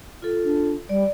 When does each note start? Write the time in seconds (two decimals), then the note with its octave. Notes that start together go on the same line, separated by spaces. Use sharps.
0.22 F4 A4
0.44 D4
0.89 G3 D5